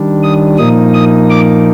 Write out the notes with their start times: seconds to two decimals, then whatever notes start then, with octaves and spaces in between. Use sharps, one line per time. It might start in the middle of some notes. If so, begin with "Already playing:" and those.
Already playing: D#3 G3 D4
0.23 D#6
0.58 A#2 F3 A#3 D#4 D#6
0.94 D#6
1.30 D6